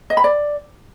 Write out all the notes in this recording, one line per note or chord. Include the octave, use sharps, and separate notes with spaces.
D#5
B5
D5